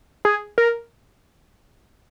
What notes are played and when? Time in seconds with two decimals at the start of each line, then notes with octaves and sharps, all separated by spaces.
0.25 G#4
0.58 A#4